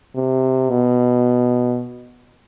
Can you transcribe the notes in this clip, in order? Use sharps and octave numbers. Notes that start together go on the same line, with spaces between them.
C3
B2